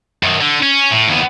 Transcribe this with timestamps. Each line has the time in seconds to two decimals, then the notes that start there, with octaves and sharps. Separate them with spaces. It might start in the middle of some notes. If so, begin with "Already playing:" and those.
0.23 F#2 D#3
0.41 D3
0.63 C#4
0.92 A2
1.09 D#2 B3